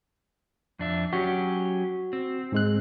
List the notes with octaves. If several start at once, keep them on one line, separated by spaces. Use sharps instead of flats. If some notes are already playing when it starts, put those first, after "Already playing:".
F2 D4 E5
F#3 C#4 F#4 G4
C4
G#2 G#3 F#6